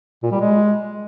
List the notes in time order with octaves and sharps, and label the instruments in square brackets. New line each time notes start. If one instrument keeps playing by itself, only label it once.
[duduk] A#2
G3
G#3